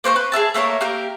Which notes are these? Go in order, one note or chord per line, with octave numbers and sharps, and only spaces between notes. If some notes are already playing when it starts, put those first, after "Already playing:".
A#3 C5 F5 C#6
B4
G#4 A4 E5 A5
A3 A#3 A#4 C#5
A#3 G4 A#4